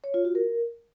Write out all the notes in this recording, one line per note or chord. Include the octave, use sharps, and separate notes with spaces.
C#5
F4
F#4
A#4